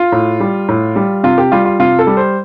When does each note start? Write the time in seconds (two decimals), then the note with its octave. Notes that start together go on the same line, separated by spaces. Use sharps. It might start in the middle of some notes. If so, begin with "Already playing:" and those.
Already playing: F4
0.12 A2
0.40 G3
0.68 A2
0.96 G3
1.23 C3 F4
1.38 G4
1.52 G3 F4
1.65 F4
1.79 C3 F4
1.99 A4
2.07 G3
2.17 C5